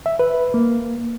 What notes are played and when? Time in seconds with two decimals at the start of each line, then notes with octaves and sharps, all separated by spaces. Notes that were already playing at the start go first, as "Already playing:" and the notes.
0.06 E5
0.19 B4
0.54 A#3